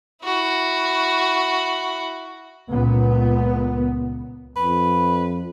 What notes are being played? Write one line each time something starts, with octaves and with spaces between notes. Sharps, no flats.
E4 F#4
C#2 A#2 B3
F2 B4